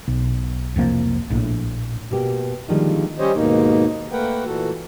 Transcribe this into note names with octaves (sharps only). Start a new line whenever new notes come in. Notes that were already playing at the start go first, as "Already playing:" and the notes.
B1
F1 C2 F3 A#3
A#1 A2
B2 A#3 G4
D3 D#3 F3 G3 G#3 A#3
G3 C#4 G4 C5 C#5 D#5
D#2 G#2 B2 A#3 D#4
A3 A#3 A#4 B4 F#5 G5
A#2 E3 F#4 A4